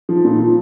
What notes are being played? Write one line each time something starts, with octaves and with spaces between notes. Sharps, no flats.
F3
A#2
F3